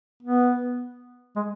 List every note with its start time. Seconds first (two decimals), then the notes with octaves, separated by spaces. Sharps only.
0.23 B3
1.36 G#3